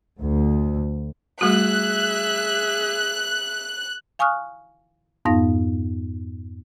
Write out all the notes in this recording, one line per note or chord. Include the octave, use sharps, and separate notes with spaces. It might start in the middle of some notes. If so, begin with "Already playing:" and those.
D2
G3 A3 F#4 G#4 E5 F#6
F5 G#5 C#6 D#6 F6 F#6
F2 G#2 B3 D#4 F5 A#6